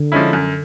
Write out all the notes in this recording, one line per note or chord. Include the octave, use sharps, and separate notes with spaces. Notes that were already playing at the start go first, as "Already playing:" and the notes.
Already playing: D3
F3 G#3 C#4 E4
F#2